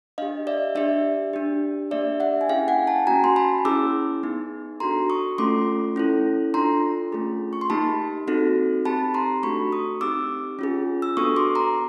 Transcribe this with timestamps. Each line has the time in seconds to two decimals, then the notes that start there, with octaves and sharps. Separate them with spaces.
0.18 D4 D#5 F5
0.22 G4
0.47 D5 E5
0.75 D4 G4 D5 E5
1.33 D4 G4
1.91 A#3 D4 G4 D5 E5
2.20 E5 F#5
2.41 G#5
2.49 C#4 E4 G#4 F5 G5
2.68 F#5 G#5
2.87 G5 A5
3.07 A#3 C#4 F#4 G#5 A#5
3.24 C6
3.36 A5 B5
3.65 C#4 E4 G#4 D6 E6
4.23 B3 D#4 G#4
4.80 D4 F#4 A4 A#5 C6
5.10 C#6 D#6
5.38 A3 C#4 F4 A4 C6 D6
5.96 C#4 E4 A4
6.54 D4 F4 A4 A#5 C6
7.12 A3 C#4 F4 G#4
7.53 C#6
7.61 C6
7.70 A#3 D#4 G4 A5 B5
8.27 C4 D#4 F#4 A4
8.85 C4 D#4 G4 A5 B5
9.14 A#5 C6
9.43 A3 D4 F#4 A4 B5 C#6
9.72 C#6 D#6
10.01 C4 D#4 G4 D6 E6
10.59 C#4 F4 G#4
11.02 E6
11.17 B3 D4 F#4 A4 C#6 D#6
11.36 C6 D6
11.55 A#5 C6